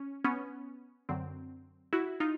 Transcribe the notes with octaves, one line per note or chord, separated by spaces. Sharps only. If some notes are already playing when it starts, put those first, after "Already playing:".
Already playing: C#4
B3 C#4
F#2 D3 F#3 C4
E4 F#4
D#4 F4